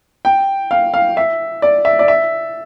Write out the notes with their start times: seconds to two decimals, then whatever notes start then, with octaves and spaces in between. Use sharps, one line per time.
0.25 G5
0.71 F5
0.94 F5
1.17 E5
1.62 D5
1.85 E5
1.99 D5
2.08 E5